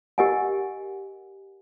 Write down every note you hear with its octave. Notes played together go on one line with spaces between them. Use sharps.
G4 A#4 D#5 F#5 G#5